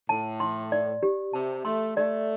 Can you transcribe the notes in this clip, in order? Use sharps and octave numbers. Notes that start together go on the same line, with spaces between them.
A2 A5
C6
D5
G4
C3 A5
A3 C6
A3 D5